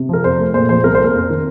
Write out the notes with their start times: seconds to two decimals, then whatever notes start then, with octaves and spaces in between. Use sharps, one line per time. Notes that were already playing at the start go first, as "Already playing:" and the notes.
Already playing: C3
0.09 F3 A#4
0.24 F2 C5
0.39 A3
0.54 A#2 C5
0.69 F3 C5
0.84 C2 A#4
0.95 C5
0.99 A#3 A#4
1.15 F2
1.30 D#3